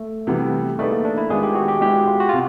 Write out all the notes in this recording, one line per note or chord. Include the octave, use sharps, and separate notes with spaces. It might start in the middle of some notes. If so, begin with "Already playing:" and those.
Already playing: A3
C3 E3 G3 B3
A3 B3 D#4 G#4 B4 D5
A#3
D4
E4
D#3 G#3 B3 D4 F4 G#4
G4
F#4
G4
G#3 B3 E4 G4
F4
F#4
F4
C3